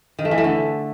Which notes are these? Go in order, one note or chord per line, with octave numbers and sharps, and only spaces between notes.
D#3
A3
E3
A3
D3